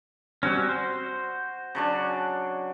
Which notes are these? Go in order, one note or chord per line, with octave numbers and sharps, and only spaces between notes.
G3 C4 C#4 F#4
C5
C#3 F#3 D4